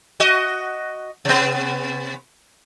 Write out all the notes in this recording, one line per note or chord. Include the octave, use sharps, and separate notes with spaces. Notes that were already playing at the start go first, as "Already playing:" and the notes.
F#4 D#5
C3 B3